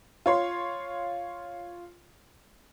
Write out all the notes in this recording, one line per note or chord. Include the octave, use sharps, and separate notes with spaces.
F4 C#5 C6